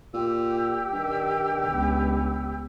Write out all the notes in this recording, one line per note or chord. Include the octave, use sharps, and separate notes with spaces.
A#2 G4 E6
G2 D#3 D4
C#2 B3